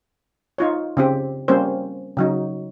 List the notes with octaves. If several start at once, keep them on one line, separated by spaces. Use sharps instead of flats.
D#4 F4 C#5
C#3 C4 G4
G3 A#3 C4 C#4 C5
C#3 F#3 D#4